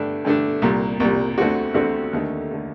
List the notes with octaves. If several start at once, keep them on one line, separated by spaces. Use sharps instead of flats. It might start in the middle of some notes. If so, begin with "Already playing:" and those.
Already playing: G2 D3 A3 D4
G2 D3 A3 D4
C2 A#2 G3
C2 A#2 G3
D2 D3 A3 C4 F#4
D2 D3 A3 C4 F#4
D#2 D3 A3
D3 A3